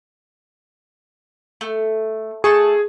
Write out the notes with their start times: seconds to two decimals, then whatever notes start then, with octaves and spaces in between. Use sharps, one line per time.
1.61 A3
2.44 A3 G#4 A5 C#6